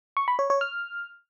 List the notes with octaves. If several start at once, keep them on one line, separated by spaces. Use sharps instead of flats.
C#6
B5
C#5
C#5
F6